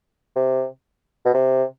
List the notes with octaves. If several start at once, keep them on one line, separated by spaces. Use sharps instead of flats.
C3
B2
C3